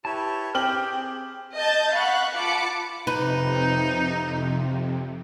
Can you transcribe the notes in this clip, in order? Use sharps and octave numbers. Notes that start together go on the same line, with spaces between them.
E4 G4 B4 C#5 A5
C4 G4 G#4 G5 F6 F#7
D#5 A5 G6 A6
F5 F#5 B5 C#6 F#6
F4 A5 B5 D6 C#7
F2 C3 D#4 B4